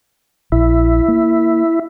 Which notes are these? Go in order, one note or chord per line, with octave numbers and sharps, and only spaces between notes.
A#1 E4
A#3